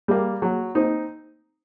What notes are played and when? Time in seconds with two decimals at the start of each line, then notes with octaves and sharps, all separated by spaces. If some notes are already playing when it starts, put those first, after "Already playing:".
0.08 G3 A#3
0.42 F#3
0.75 C4 D#4